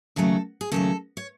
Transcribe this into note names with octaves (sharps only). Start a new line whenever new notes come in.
D#2 C#3 F#3 A3 A4
G#4
D#2 C#3 F#3 A3 A4
C#5